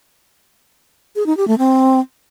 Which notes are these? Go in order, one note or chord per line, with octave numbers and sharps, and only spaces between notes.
G#4
D#4
G4
A3
C4